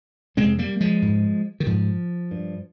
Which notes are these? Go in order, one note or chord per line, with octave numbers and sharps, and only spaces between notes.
F2 C3 G#3 C4
G3 A#3
F3 G#3
G#2
D#3
G#2 F3
G2